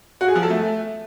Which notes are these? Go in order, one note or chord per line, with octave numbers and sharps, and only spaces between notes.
F#4
G#4
F3
A4
A3